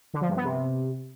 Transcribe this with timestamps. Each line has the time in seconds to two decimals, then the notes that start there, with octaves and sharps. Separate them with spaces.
0.14 D3
0.21 F3
0.29 G2
0.37 B3
0.44 C3